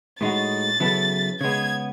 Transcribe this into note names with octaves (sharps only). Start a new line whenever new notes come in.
A2 G#3 D#4 F#4 A6
C#3 F#3 B3 E4 A4
C#3 G#3 B3 G#6